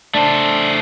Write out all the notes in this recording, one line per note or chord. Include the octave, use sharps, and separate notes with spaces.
A3 D4 C5